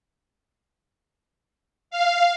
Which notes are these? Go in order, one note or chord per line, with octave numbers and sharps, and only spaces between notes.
F5